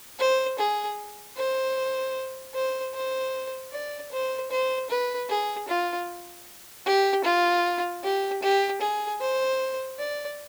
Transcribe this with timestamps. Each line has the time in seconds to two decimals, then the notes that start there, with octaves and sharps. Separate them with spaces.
0.19 C5
0.59 G#4
1.37 C5
2.55 C5
2.94 C5
3.73 D5
4.12 C5
4.51 C5
4.90 B4
5.29 G#4
5.68 F4
6.86 G4
7.25 F4
8.04 G4
8.42 G4
8.81 G#4
9.21 C5
9.99 D5